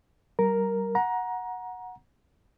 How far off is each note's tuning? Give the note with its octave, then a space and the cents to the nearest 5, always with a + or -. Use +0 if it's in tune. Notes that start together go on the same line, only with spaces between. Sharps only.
G3 -35 A#4 +0 A#5 +0
F#5 -10 A#5 +20